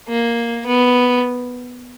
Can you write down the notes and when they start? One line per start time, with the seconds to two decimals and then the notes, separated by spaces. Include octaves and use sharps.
0.08 A#3
0.66 B3